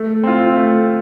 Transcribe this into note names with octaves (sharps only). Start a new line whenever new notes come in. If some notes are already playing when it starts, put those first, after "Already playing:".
Already playing: A3
C4 F4
A3